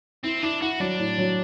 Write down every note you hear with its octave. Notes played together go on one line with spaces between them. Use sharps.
C4 E4
D4 E4
E4 F#4
F#3 D4
A2
F#3